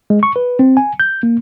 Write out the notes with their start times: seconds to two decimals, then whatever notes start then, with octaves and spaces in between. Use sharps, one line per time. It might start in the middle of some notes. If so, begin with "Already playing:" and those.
0.10 G#3
0.23 C#6
0.36 B4
0.59 C4
0.77 G#5
1.00 G6
1.23 A#3